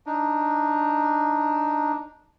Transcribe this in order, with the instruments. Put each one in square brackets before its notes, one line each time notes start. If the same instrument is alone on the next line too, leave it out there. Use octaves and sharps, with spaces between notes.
[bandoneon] D4 D#4